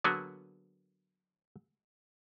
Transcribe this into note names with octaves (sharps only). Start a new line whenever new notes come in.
D3 F#3 A#3 B3 F#4 G#4